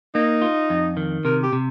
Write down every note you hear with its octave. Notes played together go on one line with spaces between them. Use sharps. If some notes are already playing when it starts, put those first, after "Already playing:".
A#3 D#4
F4
F2
D#3
C3 A#4
G4
C3